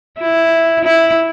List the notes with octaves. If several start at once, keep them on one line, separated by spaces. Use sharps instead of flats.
E4
E4